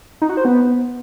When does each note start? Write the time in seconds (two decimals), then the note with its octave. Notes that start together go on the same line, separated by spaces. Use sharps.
0.22 D#4
0.29 F#4
0.37 C5
0.45 B3